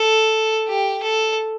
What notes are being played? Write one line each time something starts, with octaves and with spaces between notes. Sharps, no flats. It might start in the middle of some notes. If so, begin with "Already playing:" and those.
Already playing: A4
G4
A4